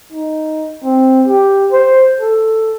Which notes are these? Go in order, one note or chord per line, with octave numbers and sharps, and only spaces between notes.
D#4
C4
G4
C5
A4